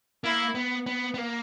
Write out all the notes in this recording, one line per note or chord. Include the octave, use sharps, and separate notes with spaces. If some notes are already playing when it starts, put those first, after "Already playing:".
A#3 E4
B3
B3
B3
A#3